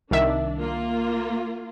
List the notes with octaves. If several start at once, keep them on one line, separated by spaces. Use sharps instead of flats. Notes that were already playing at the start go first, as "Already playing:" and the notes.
C2 D#3 D4 E5
A#3 F4